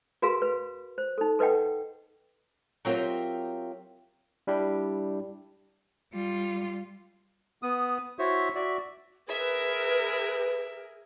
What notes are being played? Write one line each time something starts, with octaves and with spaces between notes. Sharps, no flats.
F#4 G#4 A#4 B4 F5 C6
B4
C5
D#4 A4
A4 B4 D#5 F#5 G5
F#3 C4 F4 G4 A#4 E5
G3 D4 E4 G4
G3 F4
B3 D#6
E4 F#4 C5 C#5 E5
F#4 D5 E5
G#4 A#4 B4 E5